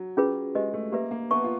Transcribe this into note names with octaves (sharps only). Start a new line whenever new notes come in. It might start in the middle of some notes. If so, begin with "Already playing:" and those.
Already playing: F#3
C#4 F4 G#4 B4
G#3 G4 B4 D#5
A3
A#3 G4 B4 E5
A#3
B3 B4 E5 A5 C#6
F4